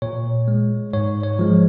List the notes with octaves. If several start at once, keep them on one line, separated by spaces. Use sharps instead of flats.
A#2 C#5
G#3
G#2 C#5
C#5
F3 G#3